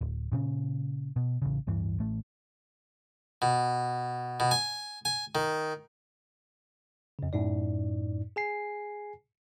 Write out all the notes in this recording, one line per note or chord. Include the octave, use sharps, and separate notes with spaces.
D1
A#2 C#3 C#4
B2
A1 C#3
D1 G2 E3
A1 A3
B2
B2
G#5
G#5
D#3
F2 C#3
F#2 A2 D#4 D5
G#4 G#5 C7